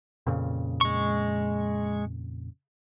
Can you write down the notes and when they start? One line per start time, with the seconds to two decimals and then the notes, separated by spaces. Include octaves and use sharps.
0.27 F2 A#2 C#3
0.81 G#3 C#6